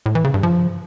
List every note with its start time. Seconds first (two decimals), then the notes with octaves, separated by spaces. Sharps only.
0.06 A2
0.15 E3
0.24 C#3
0.34 G2
0.43 F3